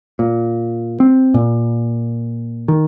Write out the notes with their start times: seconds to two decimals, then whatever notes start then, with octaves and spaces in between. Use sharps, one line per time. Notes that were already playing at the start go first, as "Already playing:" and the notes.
0.19 A#2
1.00 C4
1.34 A#2
2.68 D#3